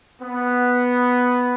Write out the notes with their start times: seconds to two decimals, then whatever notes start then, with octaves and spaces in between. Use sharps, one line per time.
0.22 B3